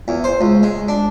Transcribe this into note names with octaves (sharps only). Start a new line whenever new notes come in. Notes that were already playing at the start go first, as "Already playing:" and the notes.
E2
C5
C#2
G#3
D4